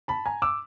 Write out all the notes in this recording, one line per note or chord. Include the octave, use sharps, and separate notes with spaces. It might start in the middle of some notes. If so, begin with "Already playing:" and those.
A5 B5
G#5 A#5
D6 E6